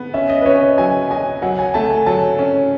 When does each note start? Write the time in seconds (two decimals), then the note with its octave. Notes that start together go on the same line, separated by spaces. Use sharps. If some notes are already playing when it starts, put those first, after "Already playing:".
Already playing: B3
0.14 C#4 E5
0.30 D#5
0.41 B4
0.46 C#4 C#5
0.61 D#5
0.78 F#3 G#5
1.11 D#5 G#5
1.42 F#3 F#5
1.59 G#5
1.74 A3 A5
1.90 G#5
2.06 F#3 A5
2.39 C#4